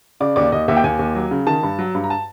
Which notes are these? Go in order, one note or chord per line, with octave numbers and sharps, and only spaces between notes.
C#3 D5
D#2 D5
D#2 D#5
D#2 E5
G5
D#2 G#5
D#2
F#3
C#3
D#3 A5
G2
F#3
G2
A#5
A5